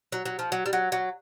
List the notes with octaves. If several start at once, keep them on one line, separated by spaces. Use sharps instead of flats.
F#3
F#3
F3
F#3
G3
F#3
F#3